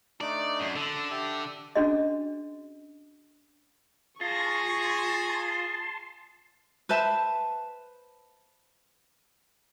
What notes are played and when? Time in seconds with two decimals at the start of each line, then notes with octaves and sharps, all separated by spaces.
0.21 A3 D4 D#4 D5
0.60 F#2
0.76 D3 A4
1.10 G4 E5 A5
1.75 C#4 D4 F#4 G#4 D#5
4.21 F4 G#4 A5 C6 C#6 A#6
6.89 B4 C5 E5 A5